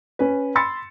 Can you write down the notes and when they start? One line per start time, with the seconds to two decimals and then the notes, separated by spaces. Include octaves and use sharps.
0.19 C#4 B4
0.55 B5 C6 E6 A6 C#7